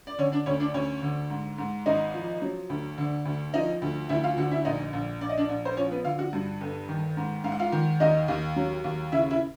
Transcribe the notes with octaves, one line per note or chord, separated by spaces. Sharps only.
D5
D3 C#4 C#5
D4 D5
D2 C#4 C#5
D4 D5
D2 C#4 C#5
D3
G#2
G#2
G#1 D#4 D#5
F3
F#3
D2
D3
D2
F3 D#4 D#5
D2
D2 E4 E5
F4 F5
D3 F#4 F#5
E4 E5
A#1 D#4 D#5
A#1
A#1 D5
D#5
D4 D5
A#1
C5
F3 C#4 C#5
B3 B4
D3 F4 F5
F#4 F#5
G2
G1
D#3
G#2
G#2 F5
F#5
F4 F5
D#3
D#2 D#4 D#5
D#2
F#3
D#2
C#3 E4 E5
E4 E5